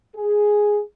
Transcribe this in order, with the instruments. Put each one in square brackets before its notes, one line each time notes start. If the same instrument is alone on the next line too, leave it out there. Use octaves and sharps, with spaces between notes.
[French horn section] G#4